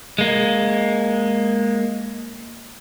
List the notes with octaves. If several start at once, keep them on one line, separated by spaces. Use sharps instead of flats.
G#3 A#3